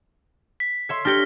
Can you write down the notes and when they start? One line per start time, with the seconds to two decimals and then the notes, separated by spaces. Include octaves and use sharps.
0.60 B6
0.89 C#5 E5 C6
1.05 D4 G4 C#5 F6 A#6 G7